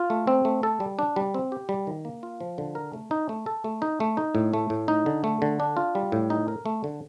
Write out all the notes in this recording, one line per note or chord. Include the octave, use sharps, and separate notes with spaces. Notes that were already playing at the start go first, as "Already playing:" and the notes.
Already playing: F4
A3
C4
A3
A4
G3
D4
G3
C4
G4
G3
D#3
A#3
F4
F3
D3
A#4
A3
D#4
A3
A4
A3
D#4
A3
D#4
A2
A3
A2
D#4
D3
A3
D3
D4
F4
G3
A2
D#4
A#4
A3
D3